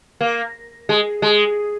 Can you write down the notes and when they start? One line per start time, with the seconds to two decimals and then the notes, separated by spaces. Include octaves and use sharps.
0.21 A#3
0.89 G#3
1.22 G#3